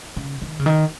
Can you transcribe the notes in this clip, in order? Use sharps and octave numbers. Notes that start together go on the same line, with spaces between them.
C#3
D#3
C#3
D#3